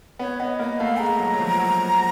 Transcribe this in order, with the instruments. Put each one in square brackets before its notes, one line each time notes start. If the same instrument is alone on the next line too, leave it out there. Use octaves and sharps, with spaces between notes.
[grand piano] B3 [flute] C#5
[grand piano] B3 [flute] D#5
[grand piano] A#3 [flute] D#5
[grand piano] A3 [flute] F5
[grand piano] G#3 [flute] A#5
[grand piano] F#3
F#3
F3
F#3